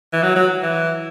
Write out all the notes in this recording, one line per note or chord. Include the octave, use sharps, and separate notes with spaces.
E3
F#3
F#3
E3